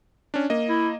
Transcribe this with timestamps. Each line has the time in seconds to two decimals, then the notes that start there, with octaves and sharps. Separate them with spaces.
0.34 C#4 D4
0.50 A#3 D#5
0.69 E4